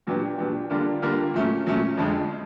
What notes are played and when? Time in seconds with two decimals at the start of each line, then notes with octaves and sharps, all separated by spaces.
0.07 A#2 F#3 B3 D4 G4
0.38 A#2 F#3 B3 D4 G4
0.70 D3 G3 A#3 D4 F4
1.02 D3 G3 A#3 D4 F4
1.34 A#2 F#3 A3 C#4
1.66 A#2 F#3 A3 C#4
1.97 F2 D3 F3 G#3